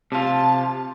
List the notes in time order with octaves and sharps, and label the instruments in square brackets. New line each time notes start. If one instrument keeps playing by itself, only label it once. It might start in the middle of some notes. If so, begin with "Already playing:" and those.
[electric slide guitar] C3 F4 [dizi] A5